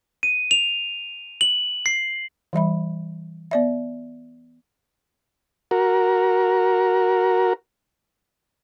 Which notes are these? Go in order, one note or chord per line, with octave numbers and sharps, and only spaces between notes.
D#7
F7
F#7
C7
E3 G3 E5 B5
B3 D5 E5
F#4 A#4